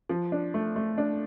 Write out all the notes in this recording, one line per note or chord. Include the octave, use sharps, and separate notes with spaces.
F3
D4
A3
A3
D4